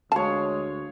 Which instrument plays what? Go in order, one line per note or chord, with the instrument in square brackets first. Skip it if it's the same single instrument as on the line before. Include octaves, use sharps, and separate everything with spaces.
[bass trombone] D2 [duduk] G#3 [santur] C#5 F5 [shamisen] A5